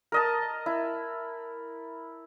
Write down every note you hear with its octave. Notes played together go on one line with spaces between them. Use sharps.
A#4 D#5 A5
E4